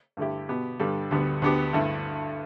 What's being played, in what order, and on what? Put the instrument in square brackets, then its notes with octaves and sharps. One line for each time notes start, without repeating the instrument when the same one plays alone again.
[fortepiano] G2 D3 A3 E4 G4
B2 B3 G4
G2 D3 G3 D4 A4
D2 D3 G3 B3
D2 D3 B3 D4 G4
G2 D3 A3 E4